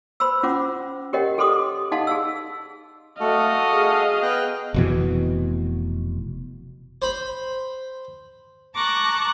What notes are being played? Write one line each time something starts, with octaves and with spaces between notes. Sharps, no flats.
B4 C5 B5 C6 E6
C#4 F4 C5 F#5 D6
G4 A#4 C#5 D#5 F#5 G5
G4 A4 B4 C6 D6 D#6
D#4 D#5 F5 F#5 A5 C6
G#4 F5 E6
A3 F#4 A4 D#5 F5
G#4
B3 G5 F#6
F1 B2 E3
C5 B5
A5 A#5 C#6 D6 F#6 A#6